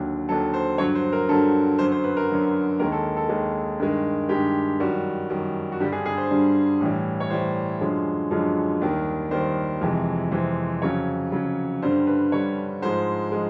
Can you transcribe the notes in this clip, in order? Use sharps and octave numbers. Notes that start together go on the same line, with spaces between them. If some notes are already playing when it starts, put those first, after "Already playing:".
Already playing: D#2 D3 F#3
D#2 D3 F#3 A4
C5
G2 D3 F#3 C#5
C5
A#4
G2 D3 F#3 A4
F#2 D3 F#3 C5
C5
B4
A#4
F#2 D3 F#3
D#2 D#3 G#3 A#4
A4
A4
D#2 D#3 G#3
G2 D#3 G#3
G2 D#3 G#3 G4
F#2 D#3 G3 F#4
F#2 D#3 G3
F#4
G2 D3 G3 G4
G#4
G#4
C5
G2 D3 G3
A2 E3 G3
C#5
A2 E3 G3 C5
F#2 D3 F3 G#3
F#2 D3 F3 G#3
D#2 D#3 G3
D#2 D#3 G3 C5
F2 C3 E3 G#3
F2 C3 E3 G#3 C5
F2 C#3 F#3 C#5
F2 C#3 F#3
G2 D3 G3 C5
B4
G2 D3 G3 C#5
G#2 F3 G#3 C5
F3 G#3